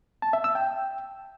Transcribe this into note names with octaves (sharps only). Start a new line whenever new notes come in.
A5
E5
E6
G5